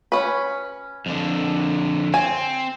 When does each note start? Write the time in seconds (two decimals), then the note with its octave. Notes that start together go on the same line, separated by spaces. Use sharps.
0.12 C#4 B4
1.06 F2 D3
2.14 C4 G#5